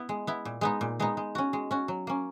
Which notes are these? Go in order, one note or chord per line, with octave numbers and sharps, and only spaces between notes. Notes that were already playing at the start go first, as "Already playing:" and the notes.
Already playing: B3 E4
G#3
B3 E4
A#2
G#3 B3 D#4
A#2
G#3 B3 D#4
G#3
C#4 F#4
G#3
C#4 F#4
F#3
A#3 C#4